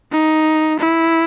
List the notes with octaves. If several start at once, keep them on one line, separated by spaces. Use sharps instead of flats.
D#4
E4